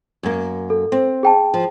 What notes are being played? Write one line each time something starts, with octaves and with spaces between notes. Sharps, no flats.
F#2 A#3
A4
C4
G#4 G5 A5
F3